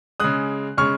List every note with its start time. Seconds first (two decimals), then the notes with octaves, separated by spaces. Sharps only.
0.20 C#3 G#3 D#6 F#6
0.77 C#3 G#3 C#6 F6